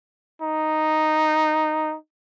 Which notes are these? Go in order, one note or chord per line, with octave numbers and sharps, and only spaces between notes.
D#4